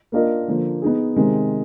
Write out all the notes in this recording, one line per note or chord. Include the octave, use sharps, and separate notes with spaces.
A#3 D4 F4 A#4 D#5
D3 F3 A#3
B3 D#4 G#4
C3 D#3 G#3 C4